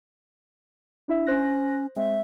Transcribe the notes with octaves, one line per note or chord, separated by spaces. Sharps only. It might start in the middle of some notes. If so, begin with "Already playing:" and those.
D4 E4 E5
C#4 C5 F#6 A#6
G#3 C4 E5